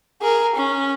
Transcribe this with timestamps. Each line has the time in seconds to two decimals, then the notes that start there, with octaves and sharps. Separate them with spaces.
0.22 G#4 A#4
0.55 C#4